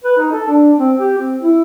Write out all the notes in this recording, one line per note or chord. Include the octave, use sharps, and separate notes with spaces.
B4
D#4
A4
D4
C4
G4
C4
E4